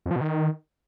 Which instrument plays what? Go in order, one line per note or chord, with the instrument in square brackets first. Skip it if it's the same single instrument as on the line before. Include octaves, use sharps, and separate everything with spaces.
[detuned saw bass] F2
F3
B2
D#3